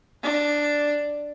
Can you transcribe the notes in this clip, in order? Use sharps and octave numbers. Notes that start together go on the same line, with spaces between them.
D4